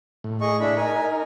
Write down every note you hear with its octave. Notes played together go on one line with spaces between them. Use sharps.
A2
G#4 D#5 C#6
D4 E4 B5
D#4 A#4 G#5